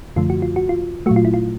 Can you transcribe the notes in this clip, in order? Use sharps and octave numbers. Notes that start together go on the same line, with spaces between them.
F#2 D3 F3 A3 F4
F#4
F4
F#4
F4
A#2 F#3 A3 F#4
F4
E4
F4